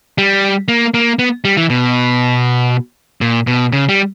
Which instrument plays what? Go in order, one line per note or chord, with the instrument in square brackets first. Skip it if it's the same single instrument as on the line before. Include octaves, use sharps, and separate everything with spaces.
[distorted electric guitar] G3
A#3
A#3
B3
G3
E3
B2
A#2
B2
C#3
G3